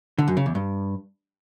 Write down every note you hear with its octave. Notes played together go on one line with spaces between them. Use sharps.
D3
F#2
C#3
E2
G2